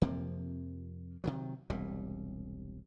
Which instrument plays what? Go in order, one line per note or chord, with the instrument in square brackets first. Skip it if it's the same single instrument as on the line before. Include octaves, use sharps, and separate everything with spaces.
[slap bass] F2 C3 F3 A#3
C3 D#3 F#3
E1 C2 A#2 G3